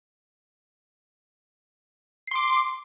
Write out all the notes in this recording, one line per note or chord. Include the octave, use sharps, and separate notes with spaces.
C6 D6 C7